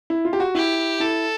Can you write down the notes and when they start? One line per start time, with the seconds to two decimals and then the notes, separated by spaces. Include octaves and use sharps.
0.10 E4
0.25 F4
0.33 G4
0.40 F#4
0.55 E4 G4
1.00 E4 A4